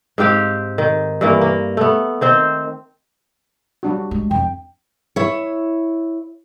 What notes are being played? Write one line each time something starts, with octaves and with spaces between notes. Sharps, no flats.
G#2 C4 G4 F5
D#3
G2 E3 A#3
A#3
A3 B3
D#3 C4 C5
G3 D4 F#4
G#3
F2 G5
E4 C#5